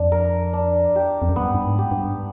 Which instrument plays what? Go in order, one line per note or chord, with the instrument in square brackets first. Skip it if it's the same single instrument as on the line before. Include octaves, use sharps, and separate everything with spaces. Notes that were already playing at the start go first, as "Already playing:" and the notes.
Already playing: [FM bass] F2 [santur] D4
[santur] A#4
D4
G4
[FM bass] F2
F#2
[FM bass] G2 [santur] B3
[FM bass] G2
G#2
[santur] G4
[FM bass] G2